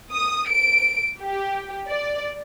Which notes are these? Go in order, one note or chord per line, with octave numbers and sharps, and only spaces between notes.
D#6
D7
G4
D5